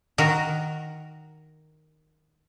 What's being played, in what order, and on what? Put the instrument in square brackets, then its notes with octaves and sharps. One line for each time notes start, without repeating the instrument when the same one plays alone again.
[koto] D#3 F#4 A#4